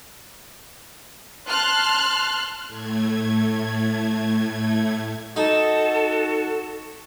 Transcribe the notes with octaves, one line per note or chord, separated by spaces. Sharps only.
A5 C6 F6 F#6
A2 A3 G#6
D#4 F#4 A4